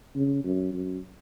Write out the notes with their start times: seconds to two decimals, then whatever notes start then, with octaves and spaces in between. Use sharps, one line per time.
0.15 C#3
0.44 F#2
0.73 F#2